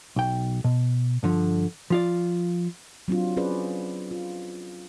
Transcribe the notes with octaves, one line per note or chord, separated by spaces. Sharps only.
B1 G5
B2
G2 D3 F3
F3 F4 D5
F#3 C4 D4 F4
C#4 G#4 B4 C5 D5
F4